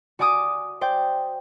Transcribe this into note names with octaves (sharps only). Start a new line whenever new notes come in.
F#4 D5 G#5 D6 D#6
C5 D5 G5